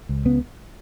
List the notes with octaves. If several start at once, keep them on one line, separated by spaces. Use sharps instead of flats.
C#2
C#3 B3